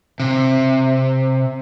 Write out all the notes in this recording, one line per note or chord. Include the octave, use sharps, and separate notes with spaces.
C3